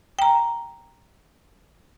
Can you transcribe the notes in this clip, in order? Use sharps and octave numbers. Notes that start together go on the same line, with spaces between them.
G5 A#5